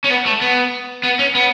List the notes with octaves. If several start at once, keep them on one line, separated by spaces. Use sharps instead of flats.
C#4
B3
A3
B3
B3
C#4
B3